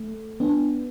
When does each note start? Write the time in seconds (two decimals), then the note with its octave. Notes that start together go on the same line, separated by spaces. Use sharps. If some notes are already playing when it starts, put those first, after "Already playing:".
Already playing: A3
0.40 B3 D4